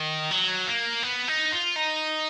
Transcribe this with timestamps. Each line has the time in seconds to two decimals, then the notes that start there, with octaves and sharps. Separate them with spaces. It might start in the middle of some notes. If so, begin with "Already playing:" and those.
Already playing: D#3
0.31 F#3
0.67 A#3
1.03 B3
1.28 D#4
1.52 F4
1.76 D#4